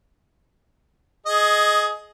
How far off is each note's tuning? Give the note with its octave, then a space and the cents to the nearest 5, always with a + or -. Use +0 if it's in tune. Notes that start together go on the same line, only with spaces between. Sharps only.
G#4 +15 D#5 +0